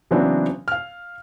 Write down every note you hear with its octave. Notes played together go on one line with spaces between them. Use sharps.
C#3 E3 F#3 B3 C4 D4
F5 F6